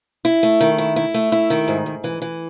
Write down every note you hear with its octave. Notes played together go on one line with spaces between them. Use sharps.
E4
A3
D#3
E4
E4
A3
E4
D#3
G#2
G#2
E3
E3